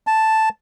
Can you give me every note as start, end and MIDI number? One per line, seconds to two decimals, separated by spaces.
0.07 0.49 81